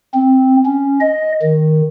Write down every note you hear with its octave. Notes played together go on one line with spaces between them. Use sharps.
C4
C#4
D#5
D#3